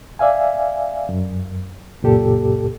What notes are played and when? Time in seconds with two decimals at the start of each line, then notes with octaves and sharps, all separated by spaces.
0.19 D5 E5 F5 G#5
1.09 F#2
2.02 C#2 F#2 A#2 G4 A4